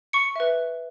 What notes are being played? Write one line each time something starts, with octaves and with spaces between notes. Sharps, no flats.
C#6 C#7
B4 E5